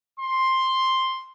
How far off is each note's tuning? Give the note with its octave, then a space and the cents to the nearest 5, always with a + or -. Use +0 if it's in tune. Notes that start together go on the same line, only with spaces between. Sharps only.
C6 +5